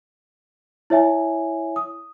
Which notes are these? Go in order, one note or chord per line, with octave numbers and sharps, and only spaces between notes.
E4 C#5 E5 G#5
D#6